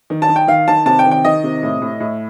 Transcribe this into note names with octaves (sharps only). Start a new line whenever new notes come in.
D#3
A5
D#3
G5
D#3 F5
D#3 A5
C3 A5
G5
D#3
G5
D#3 D#5
C3
A2
A2
A2